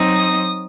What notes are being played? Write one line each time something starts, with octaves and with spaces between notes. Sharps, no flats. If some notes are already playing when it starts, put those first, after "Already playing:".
Already playing: F#3 C4 D#4
D#6